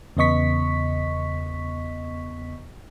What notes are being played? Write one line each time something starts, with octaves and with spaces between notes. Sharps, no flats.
E2 C#3 B3 D#5 C#6 B6